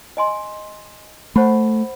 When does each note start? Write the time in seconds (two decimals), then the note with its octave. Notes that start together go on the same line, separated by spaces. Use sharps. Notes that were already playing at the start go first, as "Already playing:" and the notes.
0.17 D#5 G#5 C6
1.36 A3 C5 F#5 B5